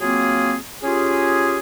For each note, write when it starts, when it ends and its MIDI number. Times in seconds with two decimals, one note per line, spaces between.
0.01 0.55 54
0.01 0.55 58
0.01 0.55 60
0.01 0.55 65
0.01 0.55 68
0.84 1.60 61
0.84 1.60 65
0.84 1.60 67
0.84 1.60 68